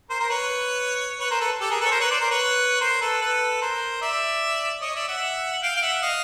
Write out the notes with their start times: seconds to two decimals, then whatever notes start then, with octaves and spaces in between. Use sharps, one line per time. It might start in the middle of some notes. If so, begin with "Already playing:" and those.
0.09 A#4 C5
0.20 A#4 C5
0.30 B4 C#5
1.20 B4 C#5
1.30 A#4 C5
1.40 A4 B4
1.60 G4 A4
1.70 G#4 A#4
1.80 A4 B4
1.86 C#5
1.91 A#4 C5
2.00 B4 C#5
2.10 C5 D5
2.21 A#4 C5
2.31 B4 C#5
2.80 A#4 C5
3.01 A4 B4
3.21 A4 B4
3.61 A#4 C5
4.02 D5 E5
4.82 C#5 D#5
4.95 D5 E5
5.08 E5 F#5
5.52 F#5
5.62 F5 G5
5.76 F5
5.82 E5 F#5
6.02 D#5 F5